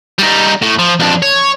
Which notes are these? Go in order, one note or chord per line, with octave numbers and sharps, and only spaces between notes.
G3 D#4
A2
F3
F2 D4
C#5